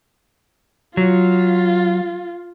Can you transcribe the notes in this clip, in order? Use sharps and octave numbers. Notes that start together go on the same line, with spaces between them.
F#3 F4